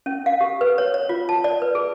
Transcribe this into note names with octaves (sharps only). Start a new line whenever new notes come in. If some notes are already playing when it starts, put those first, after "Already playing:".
C#4
F5
G4
B4
C#5
C#5
F4
A5
D5
B4
G#4